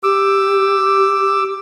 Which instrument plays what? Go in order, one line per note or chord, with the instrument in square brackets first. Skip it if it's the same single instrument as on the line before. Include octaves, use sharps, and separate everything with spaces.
[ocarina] G4 [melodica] D6 E6